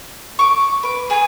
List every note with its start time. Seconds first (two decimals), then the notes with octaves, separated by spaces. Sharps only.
0.39 C#6 D6
0.83 B4 D6
1.10 G#4 G#5